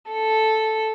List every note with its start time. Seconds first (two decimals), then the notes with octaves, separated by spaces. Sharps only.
0.12 A4